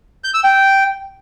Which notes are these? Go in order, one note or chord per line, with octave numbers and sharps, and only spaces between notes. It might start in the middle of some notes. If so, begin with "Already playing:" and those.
G6
E6
G5